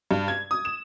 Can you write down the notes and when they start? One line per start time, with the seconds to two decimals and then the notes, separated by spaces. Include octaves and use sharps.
0.11 G2
0.28 G#6
0.51 D#6
0.65 E7